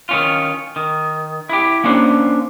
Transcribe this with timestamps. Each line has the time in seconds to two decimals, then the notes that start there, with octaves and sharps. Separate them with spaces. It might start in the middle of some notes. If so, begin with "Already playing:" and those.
0.09 D#3 C#4 F4
0.76 D#3
1.49 E4 G4
1.84 A#3 C#4 D4 C5